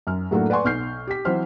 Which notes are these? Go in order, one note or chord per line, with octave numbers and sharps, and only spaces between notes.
F#2 F6
A2 F#3 A3 A#3 D4 F#4
B4 D5 F#5 G#5 C6 C#6
B1 C#6 F6 G6 C7
G4 B6
E3 F#3 C4 C5 F6